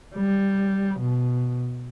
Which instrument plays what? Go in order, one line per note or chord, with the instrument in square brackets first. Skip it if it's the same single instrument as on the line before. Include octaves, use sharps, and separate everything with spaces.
[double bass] G3
B2